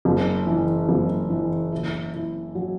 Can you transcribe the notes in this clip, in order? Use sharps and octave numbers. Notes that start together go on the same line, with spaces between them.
F#1
E3
F#1
E3
E4
E4
F#3